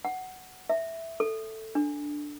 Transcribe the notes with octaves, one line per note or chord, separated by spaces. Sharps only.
F#5
E5
A4
D4